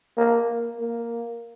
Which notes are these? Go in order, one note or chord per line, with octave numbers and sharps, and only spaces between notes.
A#3
A#3
A#3